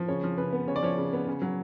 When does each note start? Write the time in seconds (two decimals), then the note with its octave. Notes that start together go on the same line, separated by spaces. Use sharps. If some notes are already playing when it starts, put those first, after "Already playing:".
Already playing: F3
0.08 C#3 C#5
0.23 F3
0.38 C#3 B4
0.53 B3
0.68 C#3 C#5
0.76 D5
0.83 F3 C#5
0.97 C#3
1.13 B3
1.28 C#3
1.42 F#3